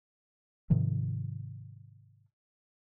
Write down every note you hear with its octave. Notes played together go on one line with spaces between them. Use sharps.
G#2 C3 D#3 F3